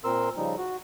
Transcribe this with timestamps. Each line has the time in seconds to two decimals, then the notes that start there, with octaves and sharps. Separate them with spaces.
0.04 A#2 C4 A#4 C6 E6
0.37 C#3 F3 G3 D#4
0.57 F#4